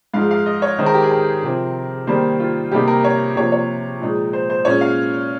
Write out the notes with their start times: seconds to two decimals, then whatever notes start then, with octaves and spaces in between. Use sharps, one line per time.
0.14 G#2 F3 G#3 D#4 F5
0.31 F5
0.46 D#5
0.62 C#5
0.78 D#3 G#3 D#4 C5
0.86 A#4
0.94 G4
1.03 G#4
1.11 A#4
1.43 C3 F3 C4
2.07 D#3 G3 A#3 D#4 C5
2.40 F4
2.71 C3 G3 A#3 D#4 G4
2.88 A#4
3.04 C#5
3.36 C3 F3 A#3 C#5
3.52 C#5
4.01 A#2 F3 G#3 D#4
4.33 C5
4.50 C5
4.65 A#2 G#3 C#4 C#5
4.81 F5